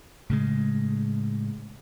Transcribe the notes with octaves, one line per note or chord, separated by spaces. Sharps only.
A2 C#3 G#3